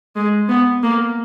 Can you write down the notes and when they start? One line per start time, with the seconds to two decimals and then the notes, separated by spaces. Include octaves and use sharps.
0.16 G#3
0.49 B3
0.83 A#3